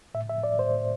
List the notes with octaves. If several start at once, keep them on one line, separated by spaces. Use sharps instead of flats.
A2 E5
A2 E5
A2 D5
A2 C5
A2